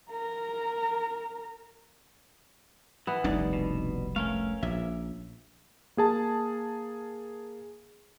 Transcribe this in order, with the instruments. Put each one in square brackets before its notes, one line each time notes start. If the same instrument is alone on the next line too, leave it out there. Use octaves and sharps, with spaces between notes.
[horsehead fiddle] A#4 A#5
[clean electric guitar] E3 [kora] B3
[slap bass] F1 C2 G2 [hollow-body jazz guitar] D4 D#4 D5
[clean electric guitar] B2
[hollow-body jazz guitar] A3 [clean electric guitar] C#4 A#4 F5
[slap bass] A#1 [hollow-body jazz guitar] E5
[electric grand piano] A#3 G#4 A5